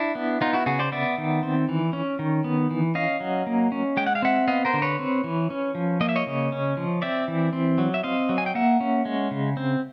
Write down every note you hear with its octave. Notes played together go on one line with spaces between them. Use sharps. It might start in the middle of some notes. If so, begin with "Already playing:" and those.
Already playing: D4 E4
B3
B3 D#4 F4
E4 F#4
C#3 F#4 G#4
C5 D5
B3 D5 E5
D#3
C4
E3
C#4
D#3
B3
E3
C#4 D#5 F5
F#3
A#3
C#4
G#3 G5
F#5
F5
C4 E5 F#5
B3 D#5 F5
A#4 C5
D3
B4 C#5
C4
E3
C#4
F3
A#3 D#5
E5
C#5 D#5
C#3
C#4
F3
C4 D5 E5
E3
C4
F#3
E5
C4 D#5 F5
F#3
G#5
G5
A#3 E5 F#5
C#4
G#3
C#3
C4